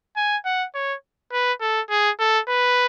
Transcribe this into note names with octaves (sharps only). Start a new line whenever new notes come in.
G#5
F#5
C#5
B4
A4
G#4
A4
B4